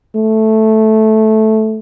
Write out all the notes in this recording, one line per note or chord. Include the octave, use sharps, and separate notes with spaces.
A3